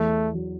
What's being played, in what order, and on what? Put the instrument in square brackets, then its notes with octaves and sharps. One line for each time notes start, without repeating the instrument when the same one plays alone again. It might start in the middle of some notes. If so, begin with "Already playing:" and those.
Already playing: [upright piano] E2 [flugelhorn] A3
[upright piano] F#3